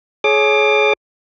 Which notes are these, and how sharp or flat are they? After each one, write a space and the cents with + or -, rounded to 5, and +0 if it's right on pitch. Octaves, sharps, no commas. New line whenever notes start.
G#4 +30 C#5 +0 D6 +25